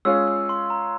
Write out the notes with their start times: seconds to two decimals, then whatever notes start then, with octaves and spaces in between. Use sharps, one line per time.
0.05 G#3 C#4 F4 G#4 C#5 E6
0.28 E6
0.49 C6
0.70 A#5